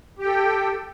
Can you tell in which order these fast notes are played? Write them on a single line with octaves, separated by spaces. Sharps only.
G4 G5 A4